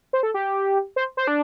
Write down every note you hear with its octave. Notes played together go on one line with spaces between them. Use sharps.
C5
A4
G4
C5
C5
D4